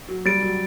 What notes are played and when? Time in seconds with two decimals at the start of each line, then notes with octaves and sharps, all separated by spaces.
0.09 F#3
0.25 G3 A6 D7
0.43 F#3